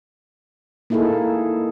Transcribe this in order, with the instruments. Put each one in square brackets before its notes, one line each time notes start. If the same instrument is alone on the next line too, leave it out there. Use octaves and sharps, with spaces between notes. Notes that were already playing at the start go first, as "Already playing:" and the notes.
[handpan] A#3 D#4 E4 G#4 A4